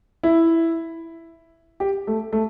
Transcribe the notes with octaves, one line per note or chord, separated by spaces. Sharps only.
E4
G4
A3
A3